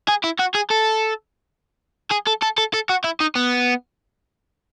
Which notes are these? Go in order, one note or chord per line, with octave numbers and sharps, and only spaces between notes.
G#4
E4
F#4
G#4
A4
G#4
A4
A4
A4
A4
F#4
E4
D#4
B3